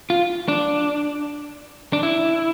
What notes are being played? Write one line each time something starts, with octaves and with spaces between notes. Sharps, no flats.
F4
D4
D4
E4